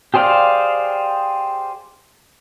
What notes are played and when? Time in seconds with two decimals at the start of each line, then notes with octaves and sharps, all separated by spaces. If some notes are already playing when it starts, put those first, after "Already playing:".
0.14 G4 G#4 C5 D5 F5